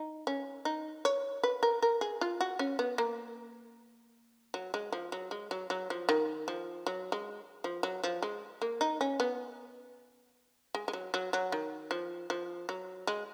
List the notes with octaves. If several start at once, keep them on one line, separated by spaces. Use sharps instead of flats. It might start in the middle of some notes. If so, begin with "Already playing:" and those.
Already playing: D#4
C#4
D#4
C#5
B4
A#4
A#4
G#4
F4
F#4
C#4
B3
A#3
F#3
G#3
F3
F#3
G#3
F#3
F#3
F3
D#3
F3
F#3
G#3
F3
F#3
F3
G#3
A#3
D#4
C#4
B3
G#3
G#3
F#3
F#3
F#3
D#3
F3
F3
F#3
G#3